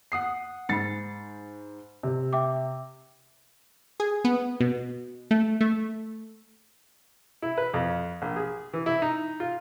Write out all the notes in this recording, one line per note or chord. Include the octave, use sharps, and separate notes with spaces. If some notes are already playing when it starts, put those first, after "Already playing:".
F#5 D#6 C7
G#2 B5 A6 C7 C#7
C3
E5 G5 D6
G#4
B3
B2
A3
A3
E4
B4
F2
A#1
G#4
E3
E4
D#4
F4